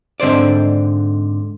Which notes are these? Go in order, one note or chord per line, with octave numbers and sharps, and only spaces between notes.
G#2 D3 C4 C5 D5